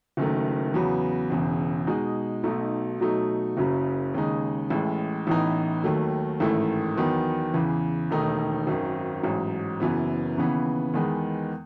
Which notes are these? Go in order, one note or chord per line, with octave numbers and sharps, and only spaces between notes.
F#1 F#2 D#3 A3
E2 C#3 F#3 B3
E1 E2 C#3
B2 G#3 D#4
B1 B2 A3 D#4
B2 F#3 A3 D#4
F#1 F#2 C#3 F#3
D#2 C#3 G#3 D#4
A1 A2 G#3
A1 A2 E3 B3 D#4
D#2 D#3 F#3 A3
A1 G#2 D#3 A3 E4
E2 D#3 F#3 B3
E2 C#3 E3
E1 D#2 D#3 A3 D#4
G#1 F#2 D#3
A1 G#2 F#3
F#1 F#2 E3 B3
D#2 C#3 E3 B3
E2 D#3 G#3 B3